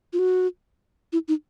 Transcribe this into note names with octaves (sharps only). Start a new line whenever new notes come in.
F4
F#4
E4
D#4